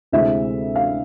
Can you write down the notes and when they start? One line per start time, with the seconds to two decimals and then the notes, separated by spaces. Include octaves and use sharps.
0.12 D2 C3 G#3 C4 E4 E5
0.76 F5